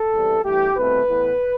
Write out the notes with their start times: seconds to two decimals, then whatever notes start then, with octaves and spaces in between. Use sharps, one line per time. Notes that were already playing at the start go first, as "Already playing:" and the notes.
Already playing: A4
0.12 E2 C3 E3 G3
0.44 G2 E3 A3 G4
0.76 C2 B2 A3 C4 B4
1.07 A2 E3 B3